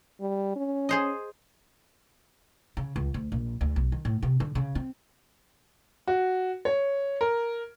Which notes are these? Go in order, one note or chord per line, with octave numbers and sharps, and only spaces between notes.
G3
C#4
G#4 C5 D#5
C#3
C#2
D2
A#1
D2
B1
D#3
A2
C3
D3
C#3
C4
F#4
C#5
A#4